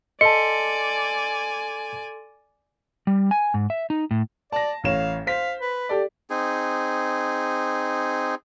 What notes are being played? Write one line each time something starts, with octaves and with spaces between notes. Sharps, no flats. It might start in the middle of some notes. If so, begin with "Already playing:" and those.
A4 D5 D#5 G#5 A5 C6 C#7
G3
G#5
G#2
E5
D#4
A2
D5 A5 A#6
A1 C#5 F5 E7
C5 F5 B6
B4
G4 A4 D5
C4 D#4 G#4